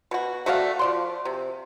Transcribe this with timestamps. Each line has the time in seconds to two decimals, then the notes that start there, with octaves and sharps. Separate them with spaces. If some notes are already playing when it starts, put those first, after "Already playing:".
0.11 B2 F#4
0.46 A3 F#4 D5 F5
0.79 F3 D5 C6
1.25 C3